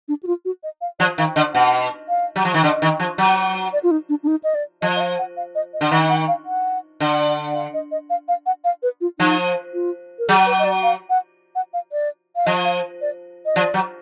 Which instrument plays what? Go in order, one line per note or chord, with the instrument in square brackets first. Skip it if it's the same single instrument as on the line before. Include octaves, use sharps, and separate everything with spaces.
[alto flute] D4
F#4
F4
F#4
D#5
F5
[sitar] F3 [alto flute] D5
[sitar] D#3 [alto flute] F5
[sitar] D3 [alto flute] D#5
[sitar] B2 [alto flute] F#5
[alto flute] F5
[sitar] F#3
F3
D#3
[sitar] D3 [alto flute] D#5
[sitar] D#3
F3
F#3
[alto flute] D5
F4
D#4
D4
D4
D#4
D#5
D5
[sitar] F3 [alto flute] D#5
[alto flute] D#5
F5
F#5
F5
D#5
D#5
[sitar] D3
[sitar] D#3 [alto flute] F#5
[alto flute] F#5
F5
F#5
[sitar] D3
[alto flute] F#5
F5
D#5
D#5
F5
F5
F#5
F5
B4
F4
[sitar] F3 [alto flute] D#4
[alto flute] F4
A#4
[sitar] F#3 [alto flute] G#4
[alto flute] B4
D#5
D5
F5
F#5
F#5
F5
D5
F5
[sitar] F3 [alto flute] D#5
[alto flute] F5
D5
D#5
[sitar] F3 [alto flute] D5
[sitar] F#3